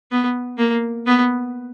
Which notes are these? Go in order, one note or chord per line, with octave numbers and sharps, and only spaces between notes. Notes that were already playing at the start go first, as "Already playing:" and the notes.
B3
A#3
B3